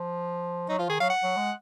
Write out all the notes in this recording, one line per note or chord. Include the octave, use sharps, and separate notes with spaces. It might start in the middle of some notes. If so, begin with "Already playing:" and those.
Already playing: F3
F#3 D#4
F3 F4
D#3 G#4
F#3 F5
F#5
F#3
G#3